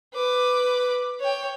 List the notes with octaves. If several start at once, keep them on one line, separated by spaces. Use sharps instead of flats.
B4 D6
C#5 G5